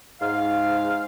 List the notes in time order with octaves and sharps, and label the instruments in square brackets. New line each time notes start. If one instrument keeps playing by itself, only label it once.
[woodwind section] G#2 F5